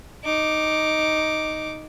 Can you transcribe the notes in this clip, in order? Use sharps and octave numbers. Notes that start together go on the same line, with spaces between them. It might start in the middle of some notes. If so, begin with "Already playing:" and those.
D#4 D6